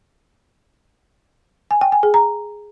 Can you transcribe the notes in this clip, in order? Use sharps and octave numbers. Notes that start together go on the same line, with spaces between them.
G#5
G5
G#5
G#4
A#5